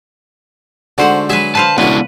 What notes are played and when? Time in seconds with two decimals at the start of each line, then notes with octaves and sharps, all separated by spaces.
0.98 G#2 D3 A3 F#4 C5 F#5
1.29 F#3 G#3 G#4 B4 E5
1.55 B4 C5 F5 A5
1.78 C#2 A2 B3 D4 E4 F#4 B4